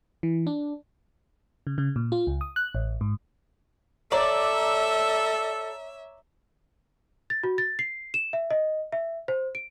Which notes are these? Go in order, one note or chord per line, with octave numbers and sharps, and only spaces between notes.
E3
D4
C#3
C#3
A#2
F4
C#2
D#6
F#6
A1
G#2
A4 C#5 D5 E5 A#5 D6
A6
F#4
A6
C7
E7
E5
D#5
E5
C5
D7